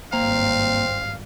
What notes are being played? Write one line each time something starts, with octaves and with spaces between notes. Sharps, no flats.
G#1 G2 A#3 C4 F5 A#5